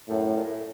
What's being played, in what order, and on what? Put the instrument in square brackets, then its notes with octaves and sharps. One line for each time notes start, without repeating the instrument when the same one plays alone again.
[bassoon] F#2 [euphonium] A2
[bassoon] A#2
A2